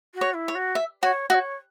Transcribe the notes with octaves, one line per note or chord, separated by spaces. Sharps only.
F#4
C#5
E4
C#5
F#4
E5
F#4 C#5
F#4 E5
C#5